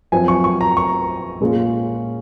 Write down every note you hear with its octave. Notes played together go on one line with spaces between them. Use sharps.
F#2 F3 C4 F4 G#5
C#6
C#6
A#5
C#6
A#2 G#3 C#4 F4